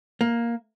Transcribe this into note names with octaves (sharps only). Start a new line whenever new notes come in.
A#3